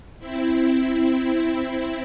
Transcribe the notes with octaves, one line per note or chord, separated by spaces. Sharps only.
C4 E4